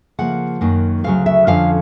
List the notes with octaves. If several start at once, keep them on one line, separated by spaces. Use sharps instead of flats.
C#3 F3 A#3 F#5
F#2 D#3 F#3 A#3
D2 C#3 F#3 F5
E5
F2 D3 F3 C#4 F5